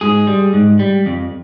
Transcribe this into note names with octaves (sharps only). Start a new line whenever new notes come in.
G#2 G#4
G3
G#2
G3
F2